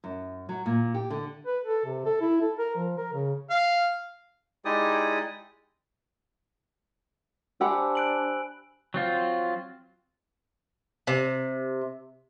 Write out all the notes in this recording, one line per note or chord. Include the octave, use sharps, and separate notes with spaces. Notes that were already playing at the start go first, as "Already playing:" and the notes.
F#2
F#3
A#2
G4
D3
B4
A4
C3
A4
E4
A4
A#4
F3
A#4
C#3
F5
G#3 D#4 E4 G4 D5 D#6
D4 G4 C5 F#5 G#5 B5 E6
F#6 D7 F#7
F#3 C4 F4
C3